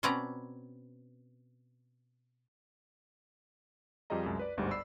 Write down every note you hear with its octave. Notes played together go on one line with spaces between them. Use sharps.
B2 C4 C#4 B4 D5 A#5
F2 G3 F4 G#4 D#5 A#5
C2 F#2 G#3
B4 D5
G1 D2 G#2 G3
D5 B5 E6 C7